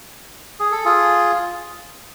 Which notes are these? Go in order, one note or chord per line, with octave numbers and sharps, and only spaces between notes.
G#4
A4
F4 G#4